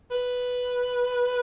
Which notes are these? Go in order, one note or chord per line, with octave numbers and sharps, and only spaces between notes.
B4